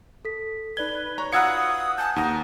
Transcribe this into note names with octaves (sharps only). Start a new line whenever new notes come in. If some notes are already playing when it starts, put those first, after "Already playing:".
A4 B6
D#4 B4 D5 G#6 G7
C#5 A#5
F4 F#4 B4 D#6 E6 G#6 C#7
G#5 A5 F#6 G6
D#2 D#4 F#5 A#5 D#6